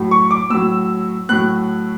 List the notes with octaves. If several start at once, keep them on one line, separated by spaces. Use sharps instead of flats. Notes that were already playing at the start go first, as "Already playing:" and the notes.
Already playing: A2 F#3
C#6
D6
A2 F#3 E6
A2 F#3 F#6